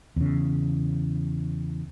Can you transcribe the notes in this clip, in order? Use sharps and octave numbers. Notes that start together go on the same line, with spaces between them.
E2 C#3